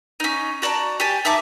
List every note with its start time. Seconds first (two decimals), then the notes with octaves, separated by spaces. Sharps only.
0.20 C#4 D#4
0.62 F#4 D5 A5 A#5
1.00 G4 G#5 A5
1.25 D#4 E5 A5 D6